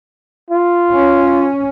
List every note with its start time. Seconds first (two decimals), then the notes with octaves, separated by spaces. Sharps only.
0.50 F4
0.92 C#4